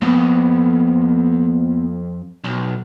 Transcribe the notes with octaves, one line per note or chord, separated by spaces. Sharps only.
F2 A#3 B3
B1